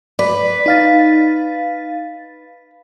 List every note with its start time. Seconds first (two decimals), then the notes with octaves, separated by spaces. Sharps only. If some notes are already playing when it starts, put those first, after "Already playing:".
0.19 B4 D5
0.66 D#4 F5 A6